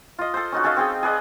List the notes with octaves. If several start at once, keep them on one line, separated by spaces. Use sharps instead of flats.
F4 D#5
A4 C5
C#4 D#4 F#4
C#4 A4 D#5 F5
C4 G#4 G5
G#4 B4 D5 D#5